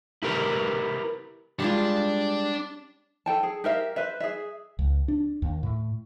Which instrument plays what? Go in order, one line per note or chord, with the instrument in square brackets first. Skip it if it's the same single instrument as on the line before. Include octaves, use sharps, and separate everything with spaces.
[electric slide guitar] E4 G4 A#4 B4
[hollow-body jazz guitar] G3 G#3 F4 [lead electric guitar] D4 D5
[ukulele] A4 G5 A5
G#4
G4 A#4 E5 F5
B4 C5 E5
G#4 E5
[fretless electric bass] C#2
D4
D#2
A2